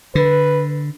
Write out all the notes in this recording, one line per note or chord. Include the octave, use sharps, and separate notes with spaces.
D3 B4